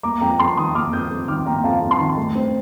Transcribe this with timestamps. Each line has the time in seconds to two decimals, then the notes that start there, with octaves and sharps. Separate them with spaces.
0.03 A#3 A#5 D6
0.21 F2 G5 A#5
0.39 F2 A5 C6
0.57 D#3 C6 D#6
0.75 A#3 D6 F6
0.93 F2 D#6 G6
1.11 F2
1.28 D#3 D6 F6
1.46 A#3 G5 A#5
1.64 F2 F5 A5
1.82 F2
1.91 A5 C6
1.99 D#3
2.17 A3
2.35 C4